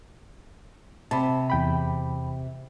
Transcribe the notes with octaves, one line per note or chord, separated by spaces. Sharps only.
C3 A5 B5
E2 G5 B5